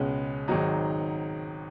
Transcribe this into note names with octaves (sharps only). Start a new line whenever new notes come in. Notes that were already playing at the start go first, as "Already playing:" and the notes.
Already playing: C#2 B2 G#3 C#4
G#1 G#2 D#3 F#3 D#4